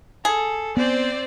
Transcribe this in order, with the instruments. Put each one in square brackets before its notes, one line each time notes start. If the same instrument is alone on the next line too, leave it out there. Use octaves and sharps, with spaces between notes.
[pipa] G#4 [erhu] A4
[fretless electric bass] B3 [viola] C4 C5 [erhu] D5